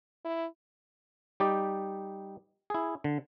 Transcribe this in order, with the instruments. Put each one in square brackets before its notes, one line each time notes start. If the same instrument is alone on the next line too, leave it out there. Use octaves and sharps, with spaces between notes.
[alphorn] E4
[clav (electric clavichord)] G3 D#4 G4 D5
E4 G#4
D3